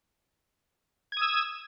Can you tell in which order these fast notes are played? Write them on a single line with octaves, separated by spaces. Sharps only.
G#6 D#6 E6